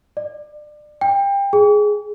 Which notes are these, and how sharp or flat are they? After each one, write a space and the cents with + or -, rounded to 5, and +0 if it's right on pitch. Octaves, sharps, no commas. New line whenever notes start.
D5 +30
G5 +25
G#4 +5